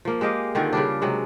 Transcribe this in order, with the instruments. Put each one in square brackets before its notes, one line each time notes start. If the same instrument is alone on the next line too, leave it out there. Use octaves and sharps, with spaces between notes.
[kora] F3 A#3
G#3 G4 D#5 F5
D3 D#3 C4 F4
C#3 G3 D4
C3 F#3 G#3